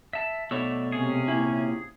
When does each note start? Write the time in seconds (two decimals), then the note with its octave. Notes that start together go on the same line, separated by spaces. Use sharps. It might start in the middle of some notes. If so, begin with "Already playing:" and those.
0.13 E5 A5
0.51 B2 A3 C#5 D5 E6
0.92 C3 C#4 G#4
1.28 A#2 E4